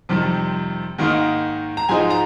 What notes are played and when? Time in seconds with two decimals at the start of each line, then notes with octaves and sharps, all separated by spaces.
0.09 F2 C3 D#3 G3
0.98 G#2 D#3 A#3 D#4
1.77 A#5
1.89 G#2 F3 G#3 D#4 G#5
2.10 A#5